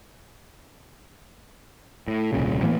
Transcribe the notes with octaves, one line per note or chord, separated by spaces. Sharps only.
A2
D#1 C2 A#2 C#3
A2 E3 A#3 B3